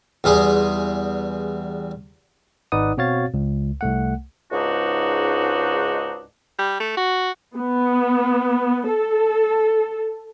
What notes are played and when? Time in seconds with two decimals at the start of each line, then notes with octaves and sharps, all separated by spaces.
0.24 E2 G3 G#4 C6
2.72 G#1 D#4 B4 D5 F#5 D#6
2.97 B2 C4 F#4 C#5 F5 A6
3.34 C#2
3.81 C2 A3 F#5
4.52 C#2 G#2 D4 D#4 F#4
6.59 G3
6.80 A3
6.97 F#4
7.56 B3
8.87 A4